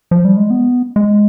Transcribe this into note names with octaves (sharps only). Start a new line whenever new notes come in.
F3
G3
G#3
B3
G#3